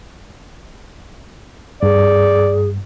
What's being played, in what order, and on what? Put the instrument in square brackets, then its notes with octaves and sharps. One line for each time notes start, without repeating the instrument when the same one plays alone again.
[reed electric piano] G2 [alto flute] G#4 [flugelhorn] D5